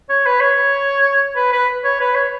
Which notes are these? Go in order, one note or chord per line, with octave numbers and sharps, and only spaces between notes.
C#5
B4
C#5
B4
B4
C#5
B4
C#5